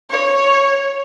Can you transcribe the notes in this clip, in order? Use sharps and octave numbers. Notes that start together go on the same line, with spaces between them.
C#5